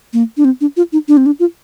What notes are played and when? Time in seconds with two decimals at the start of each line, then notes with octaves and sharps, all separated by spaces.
0.13 A#3
0.37 D4
0.45 C4
0.61 D4
0.77 F4
0.93 D#4
1.08 D4
1.17 C4
1.26 D4
1.40 F4